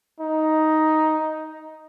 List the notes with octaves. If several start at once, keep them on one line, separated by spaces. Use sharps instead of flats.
D#4